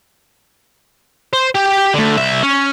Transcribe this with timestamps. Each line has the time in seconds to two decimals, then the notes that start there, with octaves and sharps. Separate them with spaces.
1.33 C5
1.55 G4
1.94 D3 A3
2.17 C2 E5
2.42 C#4